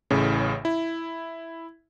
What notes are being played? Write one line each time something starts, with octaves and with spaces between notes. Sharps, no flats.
A1 A2 C#3
E4